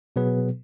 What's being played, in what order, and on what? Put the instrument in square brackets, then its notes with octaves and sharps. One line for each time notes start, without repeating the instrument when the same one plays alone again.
[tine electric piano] B2 F#3 B3 G#4 B4